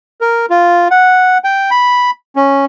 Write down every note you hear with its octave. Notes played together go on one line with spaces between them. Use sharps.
A#4
F4
F#5
G5
B5
C#4